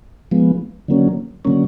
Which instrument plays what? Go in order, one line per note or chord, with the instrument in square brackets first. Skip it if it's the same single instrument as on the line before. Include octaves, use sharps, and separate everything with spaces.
[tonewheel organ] F3 G#3 B3
D3 F#3 A#3 C#4
D3 F#3 A#3 C#4